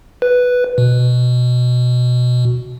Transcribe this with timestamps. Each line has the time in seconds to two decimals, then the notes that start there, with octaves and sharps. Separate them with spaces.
0.22 B4
0.78 B2